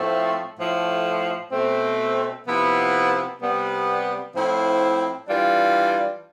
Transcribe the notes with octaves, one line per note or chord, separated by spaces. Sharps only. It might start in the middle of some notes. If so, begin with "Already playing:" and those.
Already playing: A2 F3 A3 C4
A2 F3 A3
B2 A3 C4
C3 F3 B3 E4
C3 G3 B3
A2 F3 C4 E4
E3 G3 D4 F4